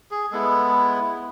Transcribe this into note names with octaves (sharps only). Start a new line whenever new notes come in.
G#4
G#3 B3 E4 A4